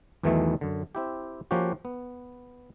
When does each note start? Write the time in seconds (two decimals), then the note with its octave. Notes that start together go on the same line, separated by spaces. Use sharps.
0.23 B1 E2 B2 D#3 E3 A3
0.61 F#2 D3
0.95 C4 E4 G4
1.51 F3 A#3 C#4 F#4 G4
1.85 B3